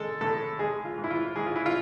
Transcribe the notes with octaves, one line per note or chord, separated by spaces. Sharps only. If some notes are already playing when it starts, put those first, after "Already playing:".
Already playing: G#3 A4
A2 A4
G#3 G#4
F4
G#2
E4
F4
G#2 G#4
F4
E4
F4